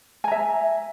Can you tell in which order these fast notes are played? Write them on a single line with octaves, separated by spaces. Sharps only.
G#5 A#5 E5